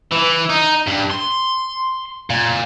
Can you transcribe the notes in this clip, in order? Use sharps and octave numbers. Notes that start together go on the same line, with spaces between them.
E3
D#4
G2
C6
A#2